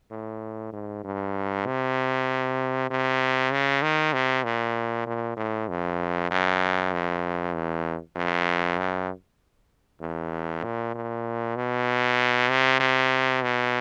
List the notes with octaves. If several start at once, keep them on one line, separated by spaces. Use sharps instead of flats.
A2
G#2
G2
C3
C3
C#3
D#3
C3
A#2
A#2
A2
F2
F#2
F2
E2
F2
F#2
E2
A#2
A#2
B2
C3
C3
B2